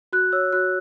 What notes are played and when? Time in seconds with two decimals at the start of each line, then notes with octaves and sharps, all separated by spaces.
0.13 F#4 F#6
0.32 C#5 E6
0.53 F#4 F#6